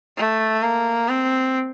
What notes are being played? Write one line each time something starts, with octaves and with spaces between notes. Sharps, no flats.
A3
A#3
C4